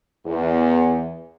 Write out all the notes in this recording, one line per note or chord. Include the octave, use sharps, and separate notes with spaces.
E2